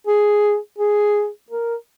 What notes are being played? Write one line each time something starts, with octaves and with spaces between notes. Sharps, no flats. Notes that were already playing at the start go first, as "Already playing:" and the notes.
G#4
G#4
A#4